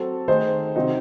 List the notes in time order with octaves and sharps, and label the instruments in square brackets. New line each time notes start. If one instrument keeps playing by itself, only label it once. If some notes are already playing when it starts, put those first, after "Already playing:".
Already playing: [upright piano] F#3 C4 F#4 A4
[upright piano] D#3 A3 D#4 G#4 [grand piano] C5
[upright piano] C3 D#3 F#3 C4 D#4